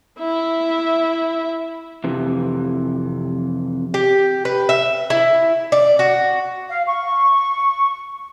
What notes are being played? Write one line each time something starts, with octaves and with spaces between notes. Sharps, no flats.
E4 E5
F2 C3 E3
G4
B4
E5
E4
D5
F#4
F5
C#6